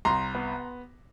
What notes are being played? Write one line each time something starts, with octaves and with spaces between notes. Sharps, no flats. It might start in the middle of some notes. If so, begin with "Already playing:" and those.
C2 A#5 C6
B3